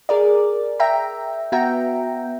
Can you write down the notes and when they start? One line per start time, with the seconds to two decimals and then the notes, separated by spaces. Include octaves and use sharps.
0.09 G#4 A#4 D5
0.80 E5 G5 A#5
1.52 B3 F#4 E5 G5 A#5